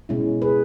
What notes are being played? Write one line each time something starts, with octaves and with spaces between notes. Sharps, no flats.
B2 G#3 C#4 E4
G#4 B4